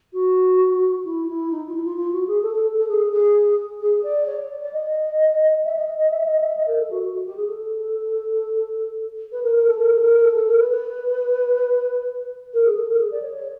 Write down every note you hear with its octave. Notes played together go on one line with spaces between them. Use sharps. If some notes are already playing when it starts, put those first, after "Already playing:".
F#4
E4
E4
D#4
F4
E4
F4
F4
F#4
G#4
A4
A4
A4
G#4
G#4
G#4
D5
C#5
D5
D5
D#5
E5
D#5
D#5
E5
E5
D#5
E5
D#5
A#4
A4
F#4
F#4
F#4
G4
G#4
A4
B4
A#4
A#4
A4
A#4
A4
A#4
A4
A4
A#4
B4
B4
A#4
G#4
A4
A#4
G#4
D5
C#5
C#5